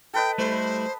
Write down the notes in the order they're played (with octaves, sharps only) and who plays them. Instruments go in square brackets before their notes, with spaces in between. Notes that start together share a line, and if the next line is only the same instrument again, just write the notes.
[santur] A4 B4 D#5 [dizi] G5
[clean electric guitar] G3 A3 E4 [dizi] C5